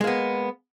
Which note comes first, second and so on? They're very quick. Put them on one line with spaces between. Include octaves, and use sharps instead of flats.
G#3 A#3 B3